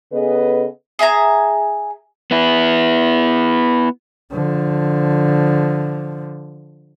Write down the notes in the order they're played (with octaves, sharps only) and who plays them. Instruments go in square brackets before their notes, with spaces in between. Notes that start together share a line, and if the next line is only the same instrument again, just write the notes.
[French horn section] C#3 B3 G#4 A4 B4 D#5
[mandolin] G#4 E5 G#5 A#5
[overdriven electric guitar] B3 E4
[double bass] D3 F3